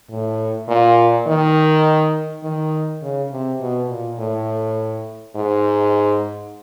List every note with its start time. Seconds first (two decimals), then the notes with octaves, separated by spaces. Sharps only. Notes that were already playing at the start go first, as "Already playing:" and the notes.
0.10 A2
0.68 A#2
1.27 D#3
2.43 D#3
3.02 C#3
3.31 C3
3.61 B2
3.89 A#2
4.19 A2
5.35 G#2